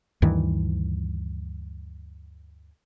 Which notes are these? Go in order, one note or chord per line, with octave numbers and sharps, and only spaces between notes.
D2 G2 D#3 E3